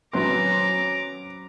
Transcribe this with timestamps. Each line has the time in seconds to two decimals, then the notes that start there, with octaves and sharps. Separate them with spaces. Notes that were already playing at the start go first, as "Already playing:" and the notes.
0.13 F#3 C4 C#4 B4 A#5 C6 D6